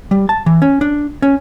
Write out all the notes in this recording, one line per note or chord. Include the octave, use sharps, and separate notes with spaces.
G3
A5
E3
C#4
D4
C#4